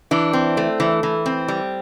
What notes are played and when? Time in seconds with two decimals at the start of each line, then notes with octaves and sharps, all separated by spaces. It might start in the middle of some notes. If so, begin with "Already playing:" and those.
0.11 E3 D4
0.33 C4
0.57 A3
0.80 E3
1.03 E3
1.26 C4
1.48 G3